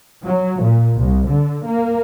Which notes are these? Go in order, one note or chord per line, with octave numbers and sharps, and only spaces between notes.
F#3
A#2
C2
D3
A#3